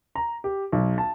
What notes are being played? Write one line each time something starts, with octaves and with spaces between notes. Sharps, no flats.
A#5
G4
B1
A5